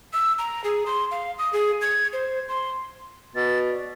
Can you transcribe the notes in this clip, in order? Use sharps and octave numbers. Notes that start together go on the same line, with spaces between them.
E6
A#5
G#4
C6
F5
D#6
G#4
G#6
C5
C6
B2 A6
D5